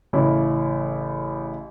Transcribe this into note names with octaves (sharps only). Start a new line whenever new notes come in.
A1 C#3 E4